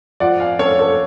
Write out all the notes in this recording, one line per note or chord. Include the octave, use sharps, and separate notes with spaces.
F3 D5 F#5
F5 G#5
C#4 A4 C#5
A4 C#5